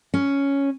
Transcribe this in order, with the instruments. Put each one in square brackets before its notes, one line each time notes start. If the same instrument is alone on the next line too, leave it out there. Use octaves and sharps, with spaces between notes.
[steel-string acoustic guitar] C#4